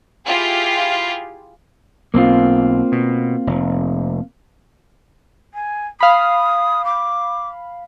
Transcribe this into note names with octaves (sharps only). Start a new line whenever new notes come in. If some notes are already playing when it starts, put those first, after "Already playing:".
E4 F4 G4 G#4
B1 A#3 C4 F4
B2
F1
G#5
F5 B5 D#6
D6